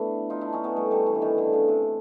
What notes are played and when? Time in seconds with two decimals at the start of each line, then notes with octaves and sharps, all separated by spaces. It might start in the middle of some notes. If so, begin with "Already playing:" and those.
Already playing: A3 B3 D4 E4
0.30 D#4 F4
0.41 D4 E4
0.53 C#4 D#4
0.64 A3 B3
0.77 G3 A3
0.91 G3 A3
1.07 E3
1.15 D3
1.22 D#3
1.38 D3
1.53 C#3
1.68 C3